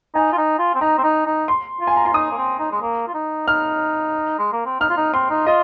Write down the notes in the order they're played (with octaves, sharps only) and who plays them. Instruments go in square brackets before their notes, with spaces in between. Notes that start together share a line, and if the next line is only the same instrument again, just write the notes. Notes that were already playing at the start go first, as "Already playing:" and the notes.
[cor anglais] D#4 [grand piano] G#5
[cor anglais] F4
D#4
F4
C4
[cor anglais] D#4 [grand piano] A#5
[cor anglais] C4
D#4
D#4
[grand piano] C6
[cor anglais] F4
[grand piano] G#5
A#5
[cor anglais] F4 [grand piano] C6
[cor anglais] D#4 [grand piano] D#6
[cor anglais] A#3
C4
D#4
G#3
A#3
F4
D#4
[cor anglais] D#4 [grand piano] F6
[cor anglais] G#3
A#3
C4
[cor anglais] D#4 [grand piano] F6
[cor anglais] F4
D#4
[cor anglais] C4 [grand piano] C6
[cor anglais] D#4
[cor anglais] F4 [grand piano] D#5